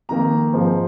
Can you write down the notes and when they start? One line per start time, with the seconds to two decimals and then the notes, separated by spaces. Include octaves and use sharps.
0.09 F2 D#3 A#3 A#5
0.53 G#2 F3 C4